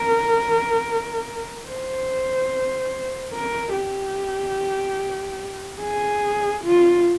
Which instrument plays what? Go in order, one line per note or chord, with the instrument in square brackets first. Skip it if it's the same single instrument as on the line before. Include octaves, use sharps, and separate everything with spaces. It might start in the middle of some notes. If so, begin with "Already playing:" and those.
Already playing: [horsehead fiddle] A#4
C5
A#4
G4
G#4
F4